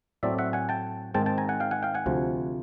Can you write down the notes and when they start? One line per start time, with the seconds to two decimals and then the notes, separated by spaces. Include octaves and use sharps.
0.23 A2 F#3 A3 C4 D5 E5
0.38 E5 F#5
0.53 F#5 G#5
0.69 G5 A5
1.14 G#2 D#3 G#3 C4 G5 A5
1.26 G5 A5
1.38 G#5 A#5
1.49 F#5 G#5
1.60 F5 G5
1.71 F#5 G#5
1.83 F5 G5
1.94 F#5 G#5
2.06 D2 C3 F3